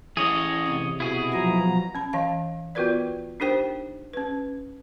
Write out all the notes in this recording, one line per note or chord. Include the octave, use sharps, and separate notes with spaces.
E3 C#4 G#4 C#5 D#5
C3
B2 E4 G#4
F3 F#3 A#5
C#4 B5
E3 D#5 F5 A5
B3 F4 F#4 A#4 B4 D5
D4 D#4 G4 A#4 C5 G5
C#4 B4